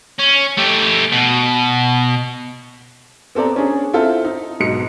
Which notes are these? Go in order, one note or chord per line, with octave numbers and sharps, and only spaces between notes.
C#4
A3 G4
B2
B3 C4 A4 D5 A#5
C#4 D4 G#4
C4 E4 F4 A4
D#4
B1 G#2 B2 C#7